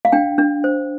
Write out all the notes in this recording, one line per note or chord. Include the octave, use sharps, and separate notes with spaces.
F5
D4 G5
D4
C5